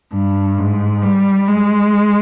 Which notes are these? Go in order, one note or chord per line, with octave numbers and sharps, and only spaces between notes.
G2
G#2
G3
G#3